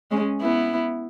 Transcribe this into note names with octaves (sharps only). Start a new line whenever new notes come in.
G#3 C#4
B3 E4